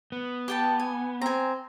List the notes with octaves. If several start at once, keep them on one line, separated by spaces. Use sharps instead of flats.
B3
G4 G5 A5
G#5
C4 G#5 A#5